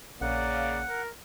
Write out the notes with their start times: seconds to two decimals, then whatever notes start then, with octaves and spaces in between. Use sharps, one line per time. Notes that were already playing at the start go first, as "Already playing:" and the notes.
0.21 A#1 C#3 A#3 D5 F#5
0.89 A#4